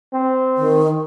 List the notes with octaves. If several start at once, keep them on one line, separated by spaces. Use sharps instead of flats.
C4
D#3